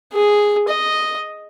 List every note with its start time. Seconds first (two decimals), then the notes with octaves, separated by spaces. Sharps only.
0.13 G#4
0.68 D#5